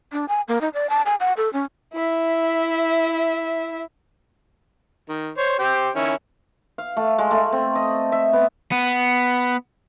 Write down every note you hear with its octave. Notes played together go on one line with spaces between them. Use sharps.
D4
G#5
A#3
D#4
D5
A5
G#5
F#5
A4
C#4
E4 E5
D#3
C5 C#5
G4 C5 G5
D#3 C#4 E4
F5
A3
G#3
A3
C4
D#5
E5
B3
B3